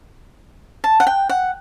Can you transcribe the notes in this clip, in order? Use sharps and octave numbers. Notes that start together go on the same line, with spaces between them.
A5
F#5
G5
F#5